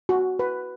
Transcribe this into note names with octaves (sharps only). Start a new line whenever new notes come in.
F#4
B4